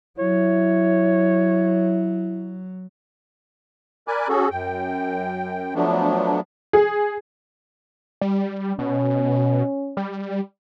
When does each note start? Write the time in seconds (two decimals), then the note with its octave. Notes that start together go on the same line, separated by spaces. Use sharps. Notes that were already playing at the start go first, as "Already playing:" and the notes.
0.19 F#3 E4 C#5
4.08 A#4 D5 G#5 B5 D6 F#6
4.29 C#4 F#4 G#4 A4
4.51 F#2 G5
5.75 F3 F#3 A3 B3 D4
6.73 G#4
8.21 G3
8.79 B2 C#4
9.97 G3